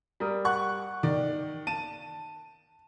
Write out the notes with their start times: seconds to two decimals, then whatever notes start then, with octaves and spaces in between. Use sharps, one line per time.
0.20 G3 A#4 D#6
0.45 F#5 C#6 F#6
1.03 D#3 D5
1.67 A5 D#7